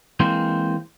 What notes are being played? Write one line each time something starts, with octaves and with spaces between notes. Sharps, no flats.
E3 G#3 A#3 C4 C5